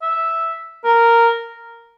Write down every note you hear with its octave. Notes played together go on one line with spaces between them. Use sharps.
E5
A#4